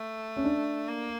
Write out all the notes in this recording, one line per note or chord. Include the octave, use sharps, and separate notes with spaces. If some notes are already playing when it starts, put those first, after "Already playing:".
Already playing: A3
C#4
D4
A#3